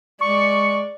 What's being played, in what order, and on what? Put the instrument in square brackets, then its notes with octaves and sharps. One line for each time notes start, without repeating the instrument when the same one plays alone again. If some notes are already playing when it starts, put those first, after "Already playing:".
[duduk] G#3 [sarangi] D5 [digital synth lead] C#6